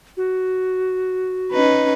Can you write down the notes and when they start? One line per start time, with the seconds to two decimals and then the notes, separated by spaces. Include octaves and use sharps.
0.17 F#4
1.52 C#4 D#4 B4